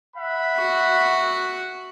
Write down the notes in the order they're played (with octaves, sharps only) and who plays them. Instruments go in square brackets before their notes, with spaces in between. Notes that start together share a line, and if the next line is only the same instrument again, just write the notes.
[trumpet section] E5 F#5 B5
[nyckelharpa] F#4